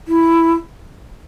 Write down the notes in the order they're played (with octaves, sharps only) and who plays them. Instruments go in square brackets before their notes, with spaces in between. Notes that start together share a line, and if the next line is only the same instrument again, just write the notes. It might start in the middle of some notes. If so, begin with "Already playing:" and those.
[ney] E4